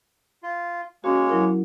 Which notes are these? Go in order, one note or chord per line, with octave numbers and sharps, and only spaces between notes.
F4
G#3 A#3 C#4 F#4 C#5
F#3 E4 A#4